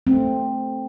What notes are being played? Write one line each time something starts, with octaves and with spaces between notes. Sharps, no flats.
A3 C4